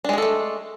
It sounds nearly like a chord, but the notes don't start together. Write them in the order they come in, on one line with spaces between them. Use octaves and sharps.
D4 G#3 G#4 A4 A3